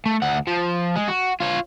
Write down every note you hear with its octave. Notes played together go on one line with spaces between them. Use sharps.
A3
D2 F#5
F3
G#3
F#4
F4 C#5